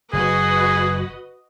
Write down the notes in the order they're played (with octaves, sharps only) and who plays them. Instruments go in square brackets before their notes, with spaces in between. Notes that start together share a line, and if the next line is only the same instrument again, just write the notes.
[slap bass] F#1 [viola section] F#4 B4 D#5 [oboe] G#4